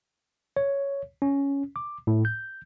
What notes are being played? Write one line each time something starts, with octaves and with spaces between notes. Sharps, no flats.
C#5
C#4
D6
A2
G6